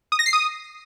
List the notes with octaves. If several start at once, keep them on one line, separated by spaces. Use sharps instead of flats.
D#6
A#6
C7
D#6